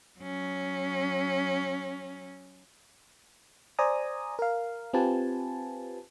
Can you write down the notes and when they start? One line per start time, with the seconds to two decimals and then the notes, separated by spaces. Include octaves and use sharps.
0.19 F#3 C#4
3.79 C5 D5 G#5 A#5 D#6
4.39 A#4 F5
4.93 C4 F4 G4 B4 G#5 A5